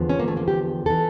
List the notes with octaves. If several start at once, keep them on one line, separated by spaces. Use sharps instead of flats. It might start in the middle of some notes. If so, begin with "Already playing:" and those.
Already playing: E2 D3 F3
C#4
A#3
A3
A#3
G4
E3 A4